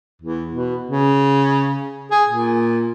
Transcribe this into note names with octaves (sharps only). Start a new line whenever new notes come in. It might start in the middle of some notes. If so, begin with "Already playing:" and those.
E2
B2
C#3
G#4
A#2